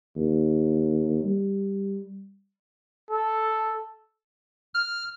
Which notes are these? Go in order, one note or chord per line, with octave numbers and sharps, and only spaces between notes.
D#2
G3
A4
F6